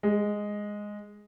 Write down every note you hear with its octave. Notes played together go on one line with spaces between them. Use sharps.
G#3